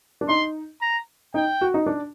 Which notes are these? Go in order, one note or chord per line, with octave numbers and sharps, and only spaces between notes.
D4
D#4 C6
A#5
D#4 G5
F#4
D#4
D4